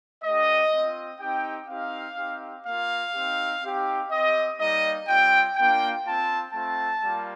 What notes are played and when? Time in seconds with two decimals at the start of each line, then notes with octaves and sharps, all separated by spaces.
0.23 A3 D4 G4 D#5
0.72 C4 F4
1.20 C4 D#4 G4 G5
1.69 C4 D#4 G4 F5
2.17 C4 D#4 G4
2.65 A#3 F4 F5
3.15 C4 D#4 G4
3.62 C4 D#4 G4
4.11 C4 G4 D#5
4.59 G3 A#3 D#4 D#5
5.08 G3 C4 F4 G5
5.56 A#3 D4 F4 G5
6.05 C4 F4 A5
6.53 A3 C4 F4 A5
7.02 G3 A#3 F4